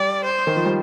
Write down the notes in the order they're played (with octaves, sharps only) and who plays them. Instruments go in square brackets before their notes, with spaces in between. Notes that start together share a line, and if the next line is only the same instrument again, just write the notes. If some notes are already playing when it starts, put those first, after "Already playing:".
Already playing: [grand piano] G3 [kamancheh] D5
[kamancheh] C5
[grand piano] D#3
F3
G3